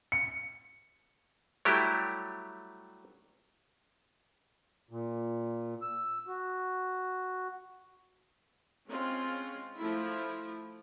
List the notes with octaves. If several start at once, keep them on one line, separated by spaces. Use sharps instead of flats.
C#7
F#3 G3 A3 E4 G4
A#2
E6
F#4
G#3 C4 C#4 F4
F3 A3 E4